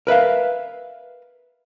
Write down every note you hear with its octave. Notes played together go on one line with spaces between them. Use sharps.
A#4 B4 E5 F5